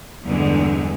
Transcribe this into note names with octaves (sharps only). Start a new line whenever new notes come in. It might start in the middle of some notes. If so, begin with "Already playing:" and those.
E2 G2 D3 G#3